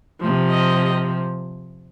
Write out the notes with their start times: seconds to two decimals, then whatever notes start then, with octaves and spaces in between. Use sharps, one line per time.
0.21 C3 F3
0.49 D#5